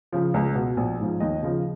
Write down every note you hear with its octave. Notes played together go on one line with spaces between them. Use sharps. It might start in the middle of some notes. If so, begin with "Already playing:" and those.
C#3 F3
C#2
B2
A#1
G#2 F3
D#2 D#5
C#3 F3